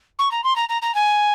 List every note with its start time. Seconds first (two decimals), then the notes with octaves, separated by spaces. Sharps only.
0.19 C#6
0.31 A#5
0.43 C6
0.56 A#5
0.69 A#5
0.82 A#5
0.94 G#5